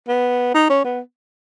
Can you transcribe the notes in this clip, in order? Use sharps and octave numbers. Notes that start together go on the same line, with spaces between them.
B3
D#4
C#4
B3